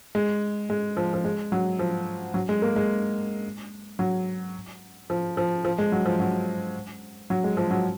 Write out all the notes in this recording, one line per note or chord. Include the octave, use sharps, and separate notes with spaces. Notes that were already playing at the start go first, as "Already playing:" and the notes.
G#3
G#3
F3
F3
G#3
F#3
F3
F#3
G#3
A#3
G#3
F#3
F3
F3
F3
G#3
F#3
F3
F#3
F#3
G#3
F3
F#3